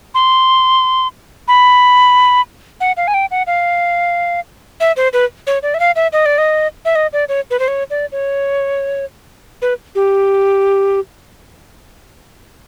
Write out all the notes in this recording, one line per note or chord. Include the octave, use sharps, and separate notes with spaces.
C6
B5
F#5
F5
G#5
G5
F#5
F5
E5
C5
B4
C#5
D5
E5
F5
E5
D#5
D5
D#5
E5
D#5
D5
C#5
B4
C5
C#5
D5
C#5
B4
G4